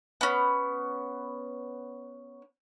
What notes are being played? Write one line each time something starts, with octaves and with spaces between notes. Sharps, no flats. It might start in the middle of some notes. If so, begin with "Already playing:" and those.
B3 C#4